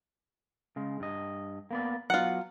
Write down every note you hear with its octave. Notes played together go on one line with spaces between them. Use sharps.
C#3 G#3
G2 D#5
A#3 B3 D5
F#3 B3 F4 F#5